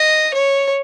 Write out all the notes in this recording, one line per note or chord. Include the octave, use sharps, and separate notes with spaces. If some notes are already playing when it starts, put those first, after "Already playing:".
Already playing: D#5
C#5